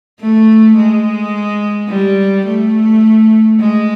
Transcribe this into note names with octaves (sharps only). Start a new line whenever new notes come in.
A3
G#3
G3
A3
G#3